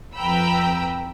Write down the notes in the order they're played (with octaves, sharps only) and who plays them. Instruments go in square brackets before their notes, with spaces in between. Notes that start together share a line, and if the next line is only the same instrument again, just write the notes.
[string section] F2 B4 G5 A#5 B5 E6